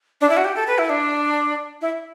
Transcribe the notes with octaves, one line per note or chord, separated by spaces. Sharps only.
D4
E4
F#4
G4
A4
B4
E4
D4
E4